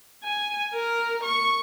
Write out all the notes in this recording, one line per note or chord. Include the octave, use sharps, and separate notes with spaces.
G#5
A#4
C#6